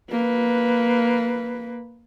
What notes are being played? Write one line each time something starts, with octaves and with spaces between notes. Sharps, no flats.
A#3 B4